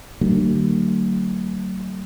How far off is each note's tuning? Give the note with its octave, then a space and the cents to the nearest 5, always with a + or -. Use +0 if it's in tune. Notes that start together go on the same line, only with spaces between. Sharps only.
D3 +30 F#3 +35 A#3 -45